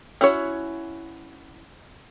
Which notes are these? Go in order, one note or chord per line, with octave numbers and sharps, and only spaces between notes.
C#4 E4 F#4 C#5